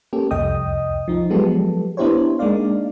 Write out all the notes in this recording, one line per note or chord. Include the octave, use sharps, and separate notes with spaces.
A#3 C#4 G4 A4
C2 F2 D#5 G5 D#6
F3 D#4
F3 F#3 G#3 B3 G4 A4
B3 D4 E4 G4 C5 C#5
G#3 A#3 D4 D#4 D5 F5